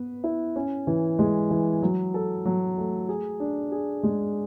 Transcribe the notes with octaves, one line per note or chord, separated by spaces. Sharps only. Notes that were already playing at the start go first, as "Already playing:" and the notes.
Already playing: B3 B4
E4
C#4
E3
G#3
E3
F#3
A4
F#3
A3
G#4
D4
G#4
G#3